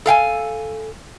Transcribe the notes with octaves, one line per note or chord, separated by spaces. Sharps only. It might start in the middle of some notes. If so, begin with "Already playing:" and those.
A4 F5 G5 G#5